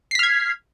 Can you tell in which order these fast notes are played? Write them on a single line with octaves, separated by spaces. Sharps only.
C7 B6 F6 G#6